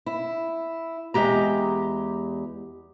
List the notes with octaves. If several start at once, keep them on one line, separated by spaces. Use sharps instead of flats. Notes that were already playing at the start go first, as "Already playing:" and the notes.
E4
E2 G#3 G4 A#5